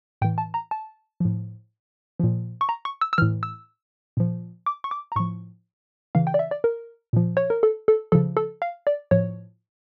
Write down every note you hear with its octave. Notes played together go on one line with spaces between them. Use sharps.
A2 E3 G5
A5
A#5
A5
A2 F3
A#2 F3
C#6
A#5
C#6
E6
E6
A2 E3 F6
E6
A#2 F3
D6
C#6
D6
A#5
A2 F3 C#6
C#3 E3 F5
G5
D5
E5
D5
A#4
A#2 F3
C#5
A#4
A4
A4
C#3 F3 A4
A4
F5
D5
A2 F3 C#5